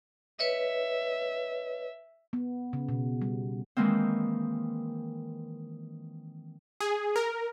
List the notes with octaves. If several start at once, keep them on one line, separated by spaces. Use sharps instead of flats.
B4 C#5 D#5 E5
B3
C#3
B2
G3
D#3 E3 G#3 A#3 C4
G#4
A#4